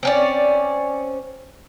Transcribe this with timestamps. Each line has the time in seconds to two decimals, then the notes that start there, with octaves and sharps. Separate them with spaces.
0.03 C4 C#4 D5